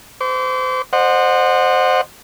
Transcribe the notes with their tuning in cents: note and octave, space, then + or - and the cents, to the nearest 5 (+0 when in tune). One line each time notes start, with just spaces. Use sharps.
C5 -30 D6 -40
C5 +0 D#5 -35 F#5 -10